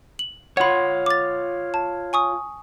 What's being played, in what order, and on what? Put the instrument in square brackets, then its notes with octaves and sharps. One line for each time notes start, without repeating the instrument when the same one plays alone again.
[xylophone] F#7
[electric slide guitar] F4 C#5 [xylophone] F#5 B5
[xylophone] D6 A6
A5
G#5 C#6 D#6